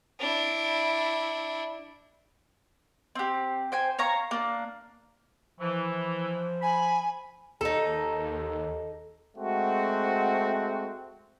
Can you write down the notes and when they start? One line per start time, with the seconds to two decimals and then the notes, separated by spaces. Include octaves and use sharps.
0.20 D4 E4
3.15 C4 G4
3.72 C5 G5 G#5
3.99 C#5 F5 A#5 C#6
4.31 A#3 D4
5.60 E3 F3
6.62 G#5 B5
7.61 D#2 D#4 A4
9.37 G#3 A3 C4 F#4